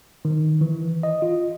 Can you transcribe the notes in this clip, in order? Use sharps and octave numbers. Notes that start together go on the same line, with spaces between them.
D#3
E3
D#5
F4